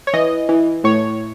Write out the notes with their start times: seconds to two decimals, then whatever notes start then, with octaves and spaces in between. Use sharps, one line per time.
0.07 C#5
0.13 E3 D#5
0.49 E3
0.84 A2 C#5